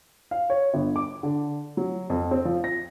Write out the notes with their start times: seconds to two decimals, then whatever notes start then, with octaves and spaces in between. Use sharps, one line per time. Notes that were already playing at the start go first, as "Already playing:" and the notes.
0.31 F5
0.50 C#5
0.74 G1
0.96 D6
1.23 D3
1.77 F#3
2.10 F2
2.31 C4
2.45 F3
2.64 A#6